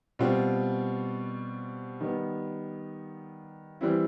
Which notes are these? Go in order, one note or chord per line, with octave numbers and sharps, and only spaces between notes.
B2 G3 C4 F4
D#3 G3 B3
E3 G3 C4 E4